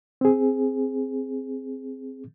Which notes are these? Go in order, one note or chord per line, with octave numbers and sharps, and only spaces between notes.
C4 G#4